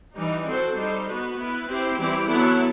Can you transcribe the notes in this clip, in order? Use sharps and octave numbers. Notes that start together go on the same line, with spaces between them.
E3 G3 D#4
C4 F#4 A4 C5
G3 D#4 A4 C5
B3 F#4 B4
B3 E4 B4
C4 E4 G4 C5
E3 G3 C4 E4 G4
F#3 B3 E4 A4